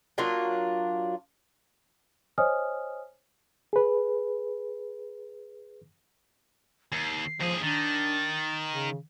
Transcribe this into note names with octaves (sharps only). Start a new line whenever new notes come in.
F#3 A#3 D4 F4
C5 C#5 D#5 G#5 D#6 F6
G#4 B4
D#2 C7
D#2 F3 G#4
D#3 D4 A6
C#3